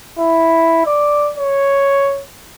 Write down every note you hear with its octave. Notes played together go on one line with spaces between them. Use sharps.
E4
D5
C#5